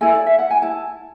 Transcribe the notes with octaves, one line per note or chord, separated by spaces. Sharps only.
E4 A4 G#5
D5
E5
F#5
G#5
E4 A5